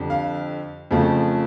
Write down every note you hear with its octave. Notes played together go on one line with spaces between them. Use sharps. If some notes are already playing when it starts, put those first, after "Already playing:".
Already playing: F2 D3 G3
F5
F2 C#3 F3 A3